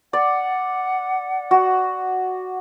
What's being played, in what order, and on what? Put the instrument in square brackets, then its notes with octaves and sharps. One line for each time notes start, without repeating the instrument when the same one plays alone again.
[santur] D5 [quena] F#5
[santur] F#4